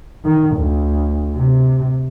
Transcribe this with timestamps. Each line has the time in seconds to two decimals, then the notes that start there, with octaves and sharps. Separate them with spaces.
0.25 D#3
0.56 D2
1.35 C3